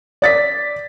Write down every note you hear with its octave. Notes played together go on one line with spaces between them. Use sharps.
D5 A6 B6